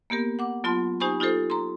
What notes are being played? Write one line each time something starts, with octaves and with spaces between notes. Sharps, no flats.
A#3 B3 G4 A#4
F#5 D6
F#3 B3 F4 A5 C6
D#4 G4 C5 G#5 B5 C#6
D#4 F4 G4 A4 C5
A#5 C6